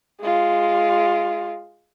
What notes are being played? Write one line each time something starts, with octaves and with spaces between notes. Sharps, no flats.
G#3 F4